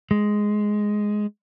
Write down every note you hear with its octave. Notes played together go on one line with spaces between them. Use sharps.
G#3